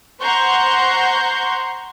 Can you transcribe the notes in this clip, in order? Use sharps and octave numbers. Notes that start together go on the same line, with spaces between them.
C5 F#5 A#5 C6 C#6 G6